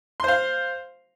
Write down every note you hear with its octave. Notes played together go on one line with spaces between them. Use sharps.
C5 F5 C6